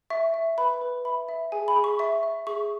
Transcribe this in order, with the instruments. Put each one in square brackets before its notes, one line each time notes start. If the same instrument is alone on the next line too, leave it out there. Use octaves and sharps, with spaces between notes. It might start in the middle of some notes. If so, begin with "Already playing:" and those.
[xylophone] E5 C#6
E5
B4 B5
B4
E5 B5
E5
G#4 G#5
B5
G#4
C#6
E5 C#6
E5
G#4 C#6